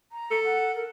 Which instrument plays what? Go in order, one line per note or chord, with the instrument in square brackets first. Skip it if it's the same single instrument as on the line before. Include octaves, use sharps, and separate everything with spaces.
[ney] A#5
[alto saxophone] A4
[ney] F#5
A#4